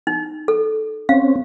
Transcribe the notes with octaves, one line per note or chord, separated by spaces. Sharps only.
D#4
A4
C4 C#4 F5